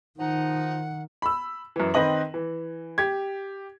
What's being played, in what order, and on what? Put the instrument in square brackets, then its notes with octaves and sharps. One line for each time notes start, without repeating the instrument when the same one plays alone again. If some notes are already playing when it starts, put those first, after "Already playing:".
[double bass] D#3 [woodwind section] F3 D#4 [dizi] F#5
[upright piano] B5 E6
F#2 E3
D#3 C4 B4 D#5 F#7
E3
G4 G#6